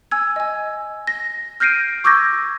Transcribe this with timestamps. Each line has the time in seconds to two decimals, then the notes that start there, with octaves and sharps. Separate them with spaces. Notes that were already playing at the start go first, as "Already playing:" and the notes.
0.11 G#5 E6 G#6
0.36 D#5 G#5
1.07 A#6
1.60 F6 G6 A#6 C7 D7 D#7
2.04 C#6 D6 E6 G6 G#6 A#6